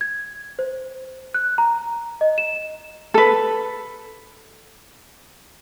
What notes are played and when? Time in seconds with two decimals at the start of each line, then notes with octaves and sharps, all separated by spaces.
0.01 G#6
0.59 C5
1.34 F#6
1.58 A#5
2.21 D#5
2.38 E7
3.14 A4 B4